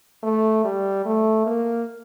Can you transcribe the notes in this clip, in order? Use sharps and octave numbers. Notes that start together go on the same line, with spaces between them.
A3
G3
A3
A#3